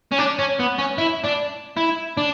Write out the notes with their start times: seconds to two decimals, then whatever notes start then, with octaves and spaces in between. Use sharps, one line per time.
0.12 C#4
0.19 D4
0.39 C#4
0.59 B3
0.78 C#4
0.98 E4
1.25 D4
1.77 E4
2.17 D4